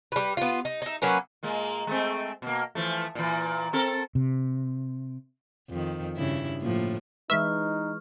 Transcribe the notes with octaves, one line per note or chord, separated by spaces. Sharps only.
G3 B4
B3 F4
D#4
D#4 E5
F#3 A#3 C#4 B4
A#2 G#3 A#3
G#3 A3 C4
B2 A#3
E3 F3 A3
A#2 E3
C4 A4 A#4
C3
F2 D#3
G2 C#3 E4
A2 F3 A#3
E3 G#3 D#4 B4 E5 C#6 F6